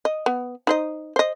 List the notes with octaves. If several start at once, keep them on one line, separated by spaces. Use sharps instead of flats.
D#5
B3
D#4 C5 D#5
C5 D#5